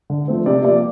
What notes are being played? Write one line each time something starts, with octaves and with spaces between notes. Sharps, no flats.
D3
F3 A3 C4
C3 D5
F3 A#3 D5